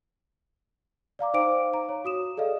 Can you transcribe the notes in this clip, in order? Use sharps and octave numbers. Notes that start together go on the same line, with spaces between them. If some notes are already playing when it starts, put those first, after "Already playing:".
D5 F5 A#5 D6
D#4 C5 F5 G5 D6 D7
A#5
C#5
F#4 D#6 E7
G#4 A4 D5 D#5 F5